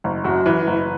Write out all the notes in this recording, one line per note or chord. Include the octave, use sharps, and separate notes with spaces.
F#1
F#2 F#4
E3 B4
F#1